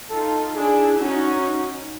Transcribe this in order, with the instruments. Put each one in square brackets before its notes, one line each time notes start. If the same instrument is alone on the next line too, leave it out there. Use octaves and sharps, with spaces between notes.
[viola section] D#4 F4 [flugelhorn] A4
[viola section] D4 E4 [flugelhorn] G#4
[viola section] C#4 D#4 [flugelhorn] F#4